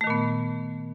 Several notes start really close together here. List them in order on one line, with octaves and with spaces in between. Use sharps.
A3 D#3 A#2 B3